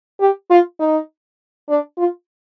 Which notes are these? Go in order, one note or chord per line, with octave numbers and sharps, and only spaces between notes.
G4
F4
D#4
D4
F4